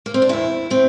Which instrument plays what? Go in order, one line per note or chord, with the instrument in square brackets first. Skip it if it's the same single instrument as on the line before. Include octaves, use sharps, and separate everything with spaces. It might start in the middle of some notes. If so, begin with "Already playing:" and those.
[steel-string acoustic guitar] A#3
C4
D4
E2 E3 E4
A2 C4